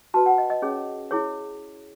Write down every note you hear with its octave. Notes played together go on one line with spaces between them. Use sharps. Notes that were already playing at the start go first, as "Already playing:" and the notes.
F#4 B4 A5
F#5
D#5
D#5
C#4 G#4 C#5
E4 G#4 C#5